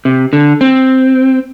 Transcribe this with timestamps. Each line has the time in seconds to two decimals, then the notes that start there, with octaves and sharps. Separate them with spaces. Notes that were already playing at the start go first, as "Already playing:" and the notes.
0.05 C3
0.33 D3
0.61 C4